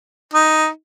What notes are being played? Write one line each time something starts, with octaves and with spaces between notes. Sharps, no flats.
D#4